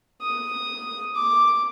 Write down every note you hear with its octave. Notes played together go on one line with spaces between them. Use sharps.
D#6
D6